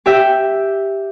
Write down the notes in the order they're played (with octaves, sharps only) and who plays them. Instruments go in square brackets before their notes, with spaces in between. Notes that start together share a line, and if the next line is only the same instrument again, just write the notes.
[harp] G4 E5 G5